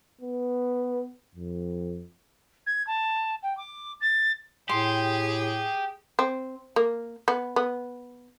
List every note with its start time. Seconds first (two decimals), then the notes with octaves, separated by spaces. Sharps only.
0.21 B3
1.35 F2
2.66 G#6
2.87 A5
3.43 G5
3.57 D6
4.01 A6
4.69 A2 G4 G#4 C6
6.19 C4
6.76 A#3
7.28 B3
7.56 B3